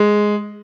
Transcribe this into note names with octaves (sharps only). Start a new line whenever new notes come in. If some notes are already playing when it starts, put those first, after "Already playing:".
Already playing: G#3